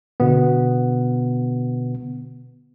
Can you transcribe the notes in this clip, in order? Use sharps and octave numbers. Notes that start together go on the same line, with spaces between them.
B2 D3 B3